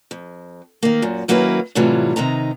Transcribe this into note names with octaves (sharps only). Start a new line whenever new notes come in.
F2
D#3 A#3
F#2 A#2
D#3 F#3 A#3 C#4 E4 B4
A2 C3 E3 F#3 G3 F4
C3 D#3 D#4 A#5